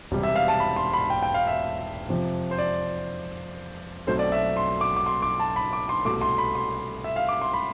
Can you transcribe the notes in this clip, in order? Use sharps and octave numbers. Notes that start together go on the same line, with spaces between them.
E1 E2 C3 G3
E5
F5
A5
B5
C6
B5
G5
G5
F5
E5
F2 C3 F3
C5
D5
B1 B2 A3 C4 C5
D5
E5
C6
D6
D6
C6
D6
A5
B5
D6
C6
C2 B2 A3 D6
C6
B5
C6
E5
F5
D6
C6
B5